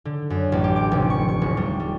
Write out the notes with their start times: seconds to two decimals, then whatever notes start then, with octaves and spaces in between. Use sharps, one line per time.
0.05 D3
0.30 F#2
0.52 A1
0.64 G4
0.76 D6
0.91 F1
1.10 C#6
1.29 C#6
1.42 D#1
1.57 G3
1.80 G3